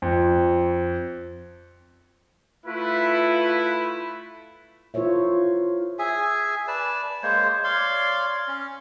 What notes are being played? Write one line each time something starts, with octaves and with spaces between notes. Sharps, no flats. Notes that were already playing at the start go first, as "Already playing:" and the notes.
F2
A3 E4 F4 B4
E4 F4 A#4 C5 C#5 E5
G#4 E5 G#5
B4 D5 A5
G#3 A#3 C5 C#5
C#5 D5 F5 C6
C#4